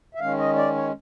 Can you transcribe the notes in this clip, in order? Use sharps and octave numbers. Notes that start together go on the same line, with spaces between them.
E5
D#3 G#3 C#4 F5
D#5
D5
C#5